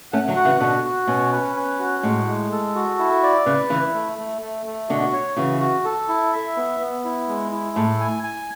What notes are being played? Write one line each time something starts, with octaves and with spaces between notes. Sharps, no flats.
A3 C#4 F#5
D3 F#3
F#4
C#3 E3
B2 D3 F#4
F#4
B2 C#4
B4
C#4
F#4
A2 G#3
G#3
A4
F#4
E4
D5
C#3 B4
C#3 E3 E4
A3
A3
A3
A3
B2 D3 F#4
C#5
C#3 E3 F#4
F#4
A4
E4
E5
B3
B3
E4
G#3
E4
A2 A4
G#5
G#5